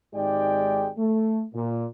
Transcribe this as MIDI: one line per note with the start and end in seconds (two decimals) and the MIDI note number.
0.14 0.89 32
0.14 0.89 44
0.14 0.89 56
0.14 0.89 67
0.14 0.89 74
0.14 0.89 79
0.97 1.43 57
1.54 1.86 46